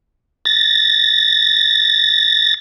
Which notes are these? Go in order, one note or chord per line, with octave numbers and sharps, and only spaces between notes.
A6 A#6